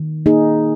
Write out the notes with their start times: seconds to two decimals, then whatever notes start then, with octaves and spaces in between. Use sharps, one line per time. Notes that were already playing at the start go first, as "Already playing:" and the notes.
Already playing: D#3
0.26 A#3 D#4 G#4